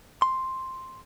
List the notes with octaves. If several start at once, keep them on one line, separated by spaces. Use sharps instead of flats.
C6